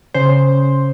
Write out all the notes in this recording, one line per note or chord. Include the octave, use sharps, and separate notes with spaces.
C#3 C5